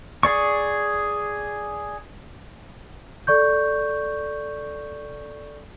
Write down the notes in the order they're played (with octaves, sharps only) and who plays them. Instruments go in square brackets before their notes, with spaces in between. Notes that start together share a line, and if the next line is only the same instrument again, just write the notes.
[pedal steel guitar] G#4 D5 C#6
[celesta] A4 D5 C#6 G6